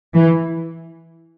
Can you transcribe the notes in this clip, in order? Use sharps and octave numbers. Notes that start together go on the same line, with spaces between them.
E3